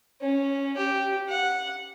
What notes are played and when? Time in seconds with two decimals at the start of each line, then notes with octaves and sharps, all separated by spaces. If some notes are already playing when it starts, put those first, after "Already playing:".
0.21 C#4
0.77 G4
1.29 F#5